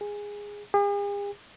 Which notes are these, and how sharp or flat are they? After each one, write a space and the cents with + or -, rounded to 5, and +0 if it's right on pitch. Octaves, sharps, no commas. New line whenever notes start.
G#4 -10
G#4 -45